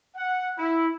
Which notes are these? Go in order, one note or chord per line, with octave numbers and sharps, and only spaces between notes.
F#5
E4